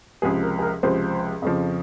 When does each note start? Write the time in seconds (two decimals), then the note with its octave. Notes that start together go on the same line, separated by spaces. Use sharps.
0.22 C#2 C3 F3 G#4
0.43 A#4
0.59 G#4
0.62 A#4
0.83 C#2 C3 F3 C5
1.42 F2 C#3 F3